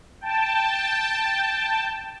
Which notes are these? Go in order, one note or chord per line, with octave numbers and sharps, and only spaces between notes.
G5 A5